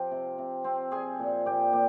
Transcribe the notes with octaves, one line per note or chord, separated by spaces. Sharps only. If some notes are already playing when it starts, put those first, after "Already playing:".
Already playing: F3 C4 F4 G4 F5 G5
C3
C3
C4
C4 G#4 G#5
A#2
A#2 G4 G5
A#2 G4 G5